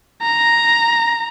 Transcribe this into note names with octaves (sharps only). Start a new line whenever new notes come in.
A#5